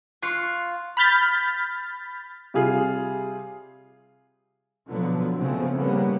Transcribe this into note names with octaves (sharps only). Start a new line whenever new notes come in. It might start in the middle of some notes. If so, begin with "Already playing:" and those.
F4 C#6 F#6 C7
B5 F6 G6 A6 B6
C3 G3 F4 G#4
B2 D3 F3 F#3 B3
C#3 F3 A3 B3 C4
A2 C#3 G3 A#3 B3